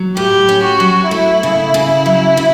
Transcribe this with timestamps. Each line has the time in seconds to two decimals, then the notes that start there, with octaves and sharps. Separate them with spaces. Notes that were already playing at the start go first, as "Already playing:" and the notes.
Already playing: F#3
0.17 A2 G4
0.49 C#4
0.65 F#4
0.80 F#3
1.11 A3 E4
1.43 C#3
1.74 C#3
2.06 F#3
2.37 C#3